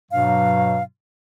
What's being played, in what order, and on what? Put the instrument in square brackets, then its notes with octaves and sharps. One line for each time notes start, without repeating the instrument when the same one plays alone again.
[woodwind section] G2 B2 F#3 [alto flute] F5